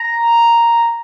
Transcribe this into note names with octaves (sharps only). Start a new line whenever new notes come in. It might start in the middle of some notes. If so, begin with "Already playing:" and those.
Already playing: A#5